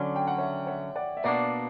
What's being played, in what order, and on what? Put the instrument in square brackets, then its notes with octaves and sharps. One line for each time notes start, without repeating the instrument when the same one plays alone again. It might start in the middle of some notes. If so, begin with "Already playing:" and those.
Already playing: [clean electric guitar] D3 F#3 C#4 [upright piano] D5
[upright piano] G5
F#5
C#5 E5
C#5 E5
D5 F#5
E5
[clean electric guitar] B2 A#3 D4 [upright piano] D5 F#5